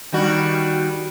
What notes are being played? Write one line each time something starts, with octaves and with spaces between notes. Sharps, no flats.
D#3 G3 F#4